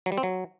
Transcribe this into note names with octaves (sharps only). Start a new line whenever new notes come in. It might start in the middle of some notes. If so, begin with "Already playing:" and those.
F#3
G3
C4
F#3